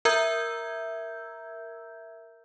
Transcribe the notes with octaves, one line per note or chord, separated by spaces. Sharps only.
A#4 E5 A#5 E6 G6 G#6